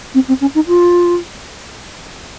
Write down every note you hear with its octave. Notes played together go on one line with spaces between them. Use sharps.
C4
C4
C#4
D#4
F4